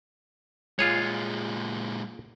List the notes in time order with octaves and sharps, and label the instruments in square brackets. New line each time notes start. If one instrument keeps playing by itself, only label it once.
[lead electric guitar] A#2 G#3 [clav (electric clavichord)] F4 G#4 C#5